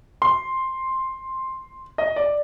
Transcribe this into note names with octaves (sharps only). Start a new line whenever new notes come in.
C6
D#5
D5